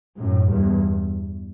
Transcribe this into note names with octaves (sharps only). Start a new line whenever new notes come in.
F#2 A2
E2 G2